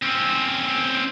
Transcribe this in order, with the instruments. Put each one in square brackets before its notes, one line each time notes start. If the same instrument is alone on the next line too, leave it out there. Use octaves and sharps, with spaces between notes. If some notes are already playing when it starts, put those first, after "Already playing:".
[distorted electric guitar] C4 C#4